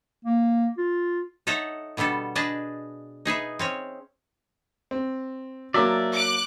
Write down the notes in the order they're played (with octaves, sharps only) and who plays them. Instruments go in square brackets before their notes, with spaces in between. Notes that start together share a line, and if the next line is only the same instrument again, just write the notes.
[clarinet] A#3
F4
[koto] D#4 A4 C#5 E5 F#5
B2 D3 G3 B3 A4
D4 G#4 B4 D#5 A5
D#4 G#4 B4 E5
C4 C#4 C#5
[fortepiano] C4
[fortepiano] F#3 A#3 [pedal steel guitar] D5 E5 A5
[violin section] D6 F#6